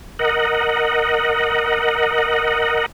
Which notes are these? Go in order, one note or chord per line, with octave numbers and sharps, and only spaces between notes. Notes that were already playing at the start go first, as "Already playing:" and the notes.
A#4 D#5 F#5